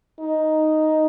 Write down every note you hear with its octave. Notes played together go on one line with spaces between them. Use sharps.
D#4